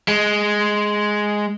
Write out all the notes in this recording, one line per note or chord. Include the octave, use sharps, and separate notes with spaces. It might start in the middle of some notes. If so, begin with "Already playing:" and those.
G#3